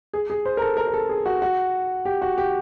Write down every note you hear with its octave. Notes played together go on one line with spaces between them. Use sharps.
G#4
G#4
C5
A#4
A4
A#4
A#4
A4
G#4
F#4
F#4
G4
F#4
G4